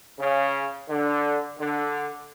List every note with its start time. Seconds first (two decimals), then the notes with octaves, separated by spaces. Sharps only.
0.18 C#3
0.88 D3
1.58 D3